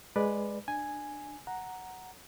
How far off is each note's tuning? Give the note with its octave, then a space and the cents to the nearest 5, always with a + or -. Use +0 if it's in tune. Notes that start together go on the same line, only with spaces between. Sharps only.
G#3 +0 B4 +0 D5 +10
D4 +20 G#5 +0
F#5 +0 A#5 +0